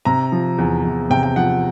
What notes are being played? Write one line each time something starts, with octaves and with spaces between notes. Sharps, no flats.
C3 A#5
F3
E2
E2
C3 G5
G5
F3 F#5